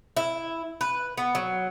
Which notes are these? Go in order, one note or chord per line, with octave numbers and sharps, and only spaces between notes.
E4
B4
B3
F#3